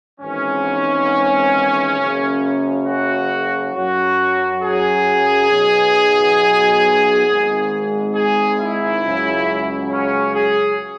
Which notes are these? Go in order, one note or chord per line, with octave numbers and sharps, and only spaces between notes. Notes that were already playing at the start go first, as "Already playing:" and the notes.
G#1 G#2 E3 C#4
F#1 F#2 C#3
F#4
F#2 F#3 F#4
G#4
B1 B2 F#3
G#1 G#2 G#3
G#4
E4
C#2 C#3 F#3
C#4
G#4